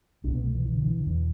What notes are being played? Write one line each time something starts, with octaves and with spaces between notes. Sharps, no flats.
C2 B2 C4 D4
B3
A3
E3
E3
D3
E3
D3
E2 B2 E3